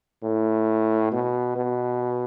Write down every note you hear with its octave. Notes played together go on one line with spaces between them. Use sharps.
A2
B2
B2